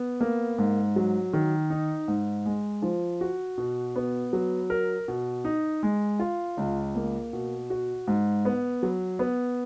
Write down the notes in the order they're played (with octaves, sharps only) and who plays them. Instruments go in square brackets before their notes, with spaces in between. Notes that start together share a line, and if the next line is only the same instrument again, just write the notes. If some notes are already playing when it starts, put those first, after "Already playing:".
Already playing: [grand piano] B3
A#3
G#2
F#3
D#3
D#4
G#2
G#3
F3
F#4
B2
B3
F#3
A#4
B2
D#4
G#3
F4
C#2
A#3
B2
F#4
G#2
B3
F#3
B3